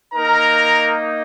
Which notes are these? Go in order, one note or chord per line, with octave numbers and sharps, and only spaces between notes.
A#3 D#4 A#4 A#5